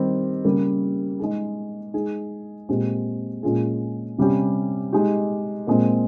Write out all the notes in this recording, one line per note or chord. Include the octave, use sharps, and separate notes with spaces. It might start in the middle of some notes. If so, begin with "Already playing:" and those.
Already playing: D#3 G3 C4 D#4
C#3 G3 A#3
G#3 D#4 G#4
G#3 D#4 G#4
A#2 G#3 C4 G4
A#2 G#3 C#4 F4 G#4
C3 G3 C#4 G4
G#3 D#4 G4
A#2 G#3 C4